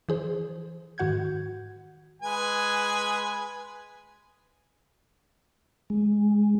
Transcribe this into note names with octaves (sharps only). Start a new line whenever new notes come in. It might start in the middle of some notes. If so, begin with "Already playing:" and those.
E3 G#4 C5
G#2 D#3 F#4 F#5 G6 G#6
G#3 B4 G#5
G#3